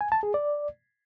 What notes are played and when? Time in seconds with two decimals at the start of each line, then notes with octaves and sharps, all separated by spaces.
0.01 G#5
0.12 A5
0.23 G#4
0.34 D5